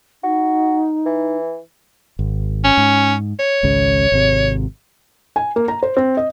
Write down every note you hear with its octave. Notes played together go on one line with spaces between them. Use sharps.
D#4 F#4
E3
G#1
C#4
G#2
C#5
G#1 C#2 C#3
G#1 C3
G#5
A#3
A#5
C5
C4
D#5